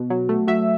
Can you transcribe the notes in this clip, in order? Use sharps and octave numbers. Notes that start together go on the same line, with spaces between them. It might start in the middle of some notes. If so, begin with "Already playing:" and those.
Already playing: B2
F#3
A3
F#3 E5